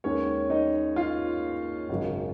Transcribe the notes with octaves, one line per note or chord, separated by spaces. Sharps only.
D#2 D#3 G#3 C#4 C#5
D#4 D#5
F4 F5
G#1 F#2 C#3